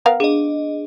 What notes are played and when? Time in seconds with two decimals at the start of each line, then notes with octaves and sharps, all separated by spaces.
0.06 B3 A#4 F5
0.20 D4 G#4 D#5